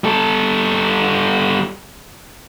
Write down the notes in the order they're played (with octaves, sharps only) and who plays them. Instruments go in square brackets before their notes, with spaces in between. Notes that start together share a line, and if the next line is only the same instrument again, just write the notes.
[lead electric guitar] G3 A4